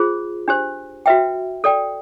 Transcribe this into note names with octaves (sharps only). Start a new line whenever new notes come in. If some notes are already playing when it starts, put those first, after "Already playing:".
Already playing: F4 G#4 C5
D4 G4 C5
F#4 B4 E5 G5
A4 D5 G5